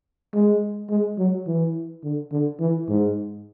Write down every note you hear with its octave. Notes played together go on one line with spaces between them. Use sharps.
G#3
G#3
F#3
E3
D3
D3
E3
G#2